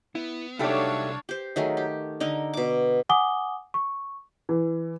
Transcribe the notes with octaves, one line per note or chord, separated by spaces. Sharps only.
B3 E4
C2 F#3 A3 D4 D#4 G4 C#5 F5
G4 C5
D#3 F#3 A3 G#4
G4
D3 D#4 A#4
B2 D6
F#5 G#5 D6 D#6 G7
C#6
E3